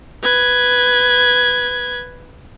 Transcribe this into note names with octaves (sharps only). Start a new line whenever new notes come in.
B4 G#6